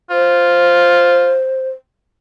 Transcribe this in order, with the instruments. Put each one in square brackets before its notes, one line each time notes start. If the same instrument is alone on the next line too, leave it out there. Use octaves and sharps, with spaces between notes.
[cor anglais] F4 [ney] C5